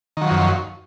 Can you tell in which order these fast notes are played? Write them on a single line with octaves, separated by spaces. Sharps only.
D#3 F#3 F3 F#2